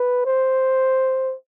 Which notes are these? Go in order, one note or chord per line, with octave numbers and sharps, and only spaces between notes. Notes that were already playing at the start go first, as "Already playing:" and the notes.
Already playing: B4
C5